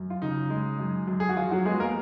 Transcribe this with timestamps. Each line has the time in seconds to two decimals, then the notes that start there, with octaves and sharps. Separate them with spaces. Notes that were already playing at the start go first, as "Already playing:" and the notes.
Already playing: F#2
0.10 F4
0.22 C#3 D#4
0.50 G#3
0.80 F#2
1.08 F#2
1.20 G#4
1.29 F#4
1.36 F3 F4
1.51 F#3 F#4
1.65 G#3 B3 G#4
1.80 A#3 A#4